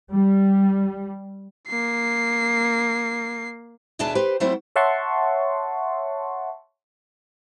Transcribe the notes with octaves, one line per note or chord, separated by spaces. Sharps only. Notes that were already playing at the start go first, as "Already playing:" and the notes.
G3
A#3 C7
D#2 B2 D4 G#4 E5 A5
G4 B4 C5
F#3 G3 A3 C4 E4 C5
C#5 E5 F#5 A5 C6 C#6